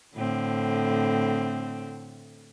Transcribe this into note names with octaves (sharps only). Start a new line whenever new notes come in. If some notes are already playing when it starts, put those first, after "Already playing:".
A2 D3 C4